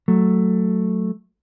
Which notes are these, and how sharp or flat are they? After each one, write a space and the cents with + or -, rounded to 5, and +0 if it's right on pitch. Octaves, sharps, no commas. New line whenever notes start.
F#3 +0 A3 +0